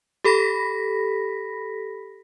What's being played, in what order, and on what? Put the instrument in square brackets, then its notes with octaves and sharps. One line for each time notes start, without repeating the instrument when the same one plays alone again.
[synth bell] G4 A4 B5 A#6 B6